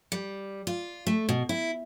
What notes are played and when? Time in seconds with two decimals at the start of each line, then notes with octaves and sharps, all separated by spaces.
0.12 G3
0.67 F4
1.07 A3
1.29 B2
1.49 E4